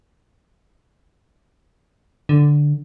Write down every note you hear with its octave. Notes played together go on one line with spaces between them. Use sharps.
D3